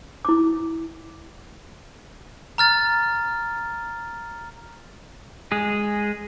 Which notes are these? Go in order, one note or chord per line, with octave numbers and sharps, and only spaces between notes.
E4 D6
A#5 F6 A6
G#3 G#4